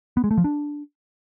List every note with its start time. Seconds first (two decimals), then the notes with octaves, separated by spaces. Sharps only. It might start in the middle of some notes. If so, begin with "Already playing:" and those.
0.17 B3
0.24 G#3
0.31 A3
0.38 F3
0.44 D4